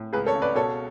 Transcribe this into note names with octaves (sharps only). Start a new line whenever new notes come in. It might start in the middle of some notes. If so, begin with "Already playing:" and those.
Already playing: A2
C#2 G#4 B4
A4 C#5
C#3
B4 D5
B2 A4 C#5